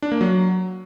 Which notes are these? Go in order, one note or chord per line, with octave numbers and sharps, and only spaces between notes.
D4
A#3
F#3